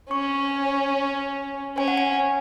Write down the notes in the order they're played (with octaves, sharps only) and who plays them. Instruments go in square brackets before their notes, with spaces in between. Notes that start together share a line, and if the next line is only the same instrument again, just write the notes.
[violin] C#4 [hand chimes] C#6
[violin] C#4 [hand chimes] G#5
[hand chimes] F#5
G#5